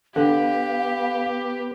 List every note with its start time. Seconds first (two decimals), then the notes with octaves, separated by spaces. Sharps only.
0.16 D3 B3 G4 B4 F5